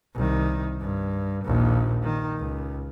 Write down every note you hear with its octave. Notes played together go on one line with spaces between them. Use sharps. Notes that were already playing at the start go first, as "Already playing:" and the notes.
C2 D#3
G2
A#1 D#2
D#3
C#2